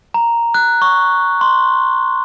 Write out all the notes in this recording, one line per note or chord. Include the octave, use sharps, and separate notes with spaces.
A#5
F#6
C#6
C6